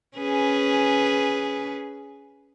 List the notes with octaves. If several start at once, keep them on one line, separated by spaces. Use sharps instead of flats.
C#4 G#4 B4